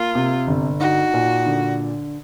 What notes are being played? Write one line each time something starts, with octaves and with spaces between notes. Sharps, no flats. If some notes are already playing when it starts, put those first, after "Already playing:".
Already playing: A#3 F4
C3
G1
D#4 F#4
A#2
D3